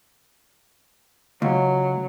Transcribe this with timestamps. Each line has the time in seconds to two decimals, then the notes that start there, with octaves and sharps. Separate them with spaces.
1.42 C#2 F#3